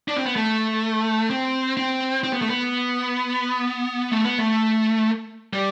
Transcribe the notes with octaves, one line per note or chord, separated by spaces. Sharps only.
D4
C4
B3
A3
C4
C4
C4
B3
A3
B3
A3
B3
A3
G3